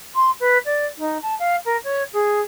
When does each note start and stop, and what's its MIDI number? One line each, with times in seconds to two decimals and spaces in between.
0.15 0.31 84
0.40 0.58 71
0.65 0.86 74
0.98 1.17 63
1.22 1.34 81
1.39 1.56 77
1.65 1.76 70
1.84 2.03 73
2.13 2.40 68